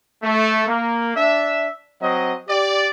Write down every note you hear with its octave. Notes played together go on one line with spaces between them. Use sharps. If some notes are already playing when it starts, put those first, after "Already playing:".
A3
A#3
D4 E5
F#3 C4 D#5
G4 D5